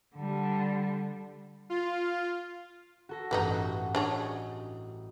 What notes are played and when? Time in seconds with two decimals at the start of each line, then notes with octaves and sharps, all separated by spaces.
0.16 D3 G3
1.70 F4
3.09 F#4 A4 A#6
3.31 A1 G2 A3 B3 D#4
3.53 F#4
3.95 D4 G#4 C#5 D#5